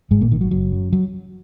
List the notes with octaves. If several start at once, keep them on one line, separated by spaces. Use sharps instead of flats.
G#1 G#2 G#3
A#2 A#3
G#1 D#3
F#3
F#1 F#3
F#2
F#3